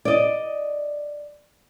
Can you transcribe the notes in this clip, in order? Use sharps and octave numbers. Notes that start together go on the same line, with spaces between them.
D5 D#5